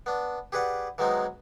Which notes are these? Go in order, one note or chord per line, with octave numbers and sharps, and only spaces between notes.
B3 D4
G4 G#4 B4 D5 F#5
E3 F#3 G#3 B3 C4 D#4